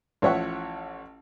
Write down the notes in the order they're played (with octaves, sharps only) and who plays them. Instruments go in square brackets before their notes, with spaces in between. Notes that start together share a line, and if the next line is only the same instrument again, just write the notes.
[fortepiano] A1 F3 C#5 E5 F#5 C#6